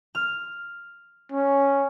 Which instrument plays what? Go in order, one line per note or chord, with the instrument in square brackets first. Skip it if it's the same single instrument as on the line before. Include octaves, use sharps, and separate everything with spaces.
[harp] F6
[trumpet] C#4